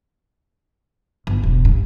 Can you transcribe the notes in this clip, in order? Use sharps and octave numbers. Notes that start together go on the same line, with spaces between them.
G1
E1
G2